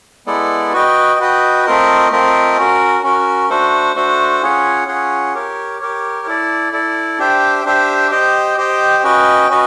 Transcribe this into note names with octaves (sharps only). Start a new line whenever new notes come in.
G#3 B3 E4 A4 D5
F#4 B4 D#5 G5
F#4 B4 D#5 G5
A3 C4 F4 A#4 D#5
A3 C4 F4 A#4 D#5
C#4 F#4 A#4
C#4 F#4 A#4
A3 D4 F#4 A4 C5
A3 D4 F#4 A4 C5
C#4 F4 G#4 C#5 F#5
C#4 F4 G#4 C#5 F#5
G4 A#4 C#5
G4 A#4 C#5
E4 A4 D5
E4 A4 D5
D4 G4 C5 E5 G5
D4 G4 C5 E5 G5
G4 C5 D#5 G5
G4 C5 D#5 G5
C#4 F#4 B4 D#5 G5
C#4 F#4 B4 D#5